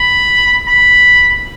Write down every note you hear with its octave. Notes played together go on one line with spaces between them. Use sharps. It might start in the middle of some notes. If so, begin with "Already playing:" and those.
Already playing: B5
B5